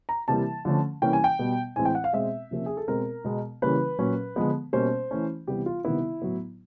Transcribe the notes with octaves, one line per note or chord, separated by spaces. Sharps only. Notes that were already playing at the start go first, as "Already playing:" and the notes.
A#5
C3 E3 G3 A#3 A5
D3 F3 A3 C#4
C3 E3 G3 A#3 C#4 G5
G#5
G5
B2 G3 B3
A2 E3 G#3 C4 G#5
G5
F#5
F5
B2 G#3 C4 E5
C3 F3 A#3 C#4
G#4
A4
B2 G#3 C4 A#4
B2 G#3 B3
C#3 E3 G3 A#3 C#4 B4
A#2 F#3 A#3 C#4
D3 F3 G#3 B3
B2 G3 A#3 C#4 C5
E3 A3 C#4
C3 E3 G3 B3 G4
F4
C3 D#3 G3 B3 E4
A2 F#3 B3